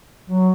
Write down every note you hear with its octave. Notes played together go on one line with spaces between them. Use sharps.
F#3